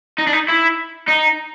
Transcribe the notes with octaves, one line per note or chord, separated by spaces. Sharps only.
D#4
D4
D#4
E4
D#4